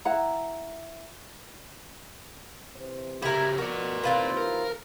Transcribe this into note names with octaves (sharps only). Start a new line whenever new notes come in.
E4 F#5 A#5
C3 E3 C5
C#3 E4 G4 A#4
B2 F3 F#4 A#4 D5
D#2 E3 C4 F4 B4 C5
A#4